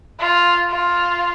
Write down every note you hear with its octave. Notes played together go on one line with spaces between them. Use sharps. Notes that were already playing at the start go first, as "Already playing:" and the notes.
F4
F4